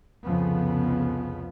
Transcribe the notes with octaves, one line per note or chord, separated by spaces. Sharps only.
C2 F2 C#3 F3 B3